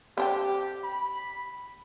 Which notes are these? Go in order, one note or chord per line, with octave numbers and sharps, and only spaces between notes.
C4 D4 G4 G5
B5